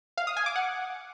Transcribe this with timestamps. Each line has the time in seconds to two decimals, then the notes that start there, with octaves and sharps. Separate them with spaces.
0.18 F5
0.27 D#6
0.37 G#5
0.46 D6
0.56 F#5